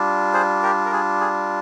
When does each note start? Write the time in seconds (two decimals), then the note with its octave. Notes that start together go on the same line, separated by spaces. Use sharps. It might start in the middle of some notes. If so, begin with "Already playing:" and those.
Already playing: G3 D4 F4
0.34 G#4 C5
0.63 G4 A#4
0.86 A#4
0.92 G#4
1.20 G#4